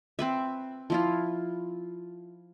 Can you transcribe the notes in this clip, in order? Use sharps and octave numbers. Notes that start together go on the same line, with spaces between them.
C4 B4 E5
F3 E4 F4